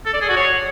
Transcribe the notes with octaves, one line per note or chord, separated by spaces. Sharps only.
A4
D5
G#4
F#4
C#5